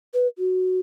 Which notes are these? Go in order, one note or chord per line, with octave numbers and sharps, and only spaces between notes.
B4
F#4